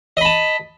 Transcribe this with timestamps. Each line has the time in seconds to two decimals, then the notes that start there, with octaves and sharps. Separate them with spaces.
0.17 D#5
0.21 B5
0.25 A5